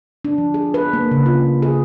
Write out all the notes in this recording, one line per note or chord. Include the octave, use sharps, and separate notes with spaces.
D4
F3
G#4
B4
A#3
C#3
F4
G#4